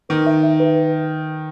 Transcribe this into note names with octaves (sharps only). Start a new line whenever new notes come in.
D#3 B4
E5
E5
B4